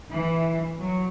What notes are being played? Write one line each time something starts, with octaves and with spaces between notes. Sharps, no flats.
E3
F#3